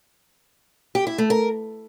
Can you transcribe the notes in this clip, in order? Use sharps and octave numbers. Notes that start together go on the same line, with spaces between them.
G4
E4
A3
A#4